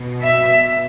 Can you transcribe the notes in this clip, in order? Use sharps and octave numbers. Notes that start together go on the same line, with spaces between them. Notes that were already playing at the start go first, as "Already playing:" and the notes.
Already playing: B2
E5